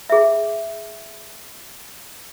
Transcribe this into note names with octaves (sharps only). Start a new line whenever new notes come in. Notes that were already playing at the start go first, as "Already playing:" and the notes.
G#4 E5